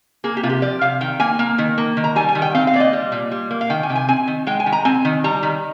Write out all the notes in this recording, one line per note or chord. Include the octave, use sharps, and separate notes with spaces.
A#3 G#4
G4
C3 F4
G4
F3 D5
C3 F5
D#3 G5
A#3 G#5
A#3
D#3
A#3
D#3
A#5
G3 G#5
G#5
D#3
G5
C4 F5
F5
A#2 D5
D#5
G3
A#2
G3
A#3
F5
D#3 G5
G#5
C3 G5
G#5
C4 G#5
D#3
G#3 G5
G#5
D#3
A#5
C4 G#5
D#3
G3 A#5
D#3